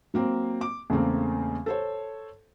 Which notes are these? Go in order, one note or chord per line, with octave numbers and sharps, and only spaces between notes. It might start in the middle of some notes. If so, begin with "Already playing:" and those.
F#3 A#3 C4
D6
E2 C#3 A3 A#3 C4
A4 C5 C#5